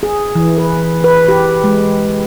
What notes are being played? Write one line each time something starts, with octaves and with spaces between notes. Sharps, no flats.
G#4
E3
B4
B4
G4
G#3